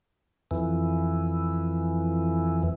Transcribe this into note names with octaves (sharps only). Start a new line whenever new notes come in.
F2 E3